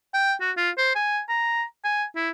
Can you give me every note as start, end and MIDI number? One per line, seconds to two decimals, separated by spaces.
0.14 0.34 79
0.41 0.51 66
0.57 0.70 65
0.78 0.90 72
0.95 1.21 80
1.29 1.63 82
1.84 2.05 80
2.16 2.30 64